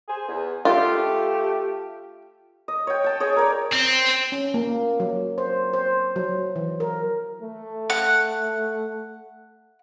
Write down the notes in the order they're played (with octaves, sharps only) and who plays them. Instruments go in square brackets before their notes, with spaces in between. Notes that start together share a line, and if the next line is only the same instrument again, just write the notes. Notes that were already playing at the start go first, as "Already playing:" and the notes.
[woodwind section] G#4 C5 G#5
E2
[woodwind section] A3 G4 [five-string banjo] F4
[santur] D#5
C#5 G5
G5 A5
G#4 C#5 D#5
A#4 C#5 D5
[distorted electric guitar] C4
[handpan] C#4
A#3
F#3
C5
C5
F#3
E3
A#4
[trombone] A3
[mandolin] F#5